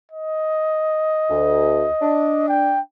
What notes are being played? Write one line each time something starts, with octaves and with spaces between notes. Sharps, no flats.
D#5
D2
D4
G5